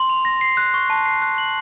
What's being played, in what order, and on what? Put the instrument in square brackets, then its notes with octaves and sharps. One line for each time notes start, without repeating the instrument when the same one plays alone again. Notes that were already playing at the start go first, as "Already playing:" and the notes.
Already playing: [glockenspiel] C6
F7
A#6
C7
F#6
C#6
A5
C7
F#6
F#7